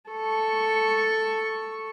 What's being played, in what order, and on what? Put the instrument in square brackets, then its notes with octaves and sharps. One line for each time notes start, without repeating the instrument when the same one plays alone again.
[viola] A4 C#6